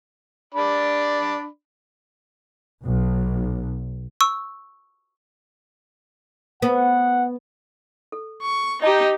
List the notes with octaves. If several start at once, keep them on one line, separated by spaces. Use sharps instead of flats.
D4 D5 B5
B1
C#6 E6
B3 F#5
A4
C#6
D#4 G4 D#5 A5 A#5